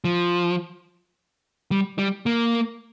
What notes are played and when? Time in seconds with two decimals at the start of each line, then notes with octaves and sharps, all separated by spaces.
0.04 F3
1.71 G3
1.98 G3
2.26 A#3